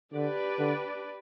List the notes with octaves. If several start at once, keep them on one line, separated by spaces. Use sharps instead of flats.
D3 D4 G4 B4 D5
D3